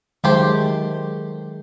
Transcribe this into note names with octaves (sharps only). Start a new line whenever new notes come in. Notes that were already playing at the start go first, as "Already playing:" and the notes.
D#3 F#3 G#3 A3 G4 C5